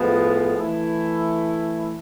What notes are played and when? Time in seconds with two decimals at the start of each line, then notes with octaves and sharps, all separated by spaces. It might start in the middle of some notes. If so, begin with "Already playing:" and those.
Already playing: A2 F3 G#3 B3
0.57 E3 A3 E4